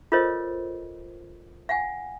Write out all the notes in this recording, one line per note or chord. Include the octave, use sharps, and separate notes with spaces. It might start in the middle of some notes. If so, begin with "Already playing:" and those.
F4 A4 A#4 C5 C#5 D#5
F5 F#5 G#5